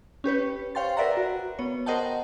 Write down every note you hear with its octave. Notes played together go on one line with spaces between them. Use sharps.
C#4 G4 B4 C#5
C5 C#5 F5 G5 C6 A6
A#4 B4 D5 E5 F#5 A#5
F#4
B3 C#5
A#4 C5 D#5 F#5 G5 A5